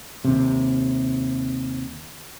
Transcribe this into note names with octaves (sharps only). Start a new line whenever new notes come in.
D#2 C3